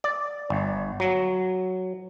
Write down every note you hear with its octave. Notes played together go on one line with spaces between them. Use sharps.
D5
G1
F#3